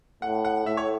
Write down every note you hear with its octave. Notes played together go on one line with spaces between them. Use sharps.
A2 F#5
F#5
A2 E5
C#5